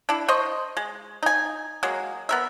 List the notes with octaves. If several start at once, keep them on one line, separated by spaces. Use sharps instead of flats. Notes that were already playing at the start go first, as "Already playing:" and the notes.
D4 E4
C5 D#5 C#6
G#3
D#4 G#5
F#3 G#3 A#3
B3 A#4 E5